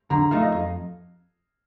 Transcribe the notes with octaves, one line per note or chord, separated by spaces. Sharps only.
D3 A#5
F3 A3 D#4 F5
D#5
F2